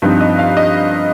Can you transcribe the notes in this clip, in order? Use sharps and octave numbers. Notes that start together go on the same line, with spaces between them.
G2 F3 C4 D#4
D#5
F5
D#5